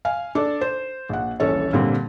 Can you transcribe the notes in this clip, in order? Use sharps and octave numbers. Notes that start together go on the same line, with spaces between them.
F5 G#5
D4 A4
C5
A#1 F#5
D#1 A#1 E3 C#4 A4 C#5
A#2 D3 G3 C4